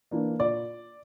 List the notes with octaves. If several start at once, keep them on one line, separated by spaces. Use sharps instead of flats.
E3 A#3 D4
A#2 D5